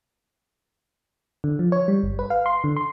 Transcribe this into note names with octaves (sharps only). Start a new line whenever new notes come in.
D3
F3
C#5
G3
G1
B4
F5
C6
D3
C6